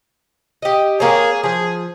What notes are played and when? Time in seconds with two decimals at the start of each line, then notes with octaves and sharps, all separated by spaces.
0.62 G4 D#5
1.00 A#3 G#4 C#5
1.44 F3 G#4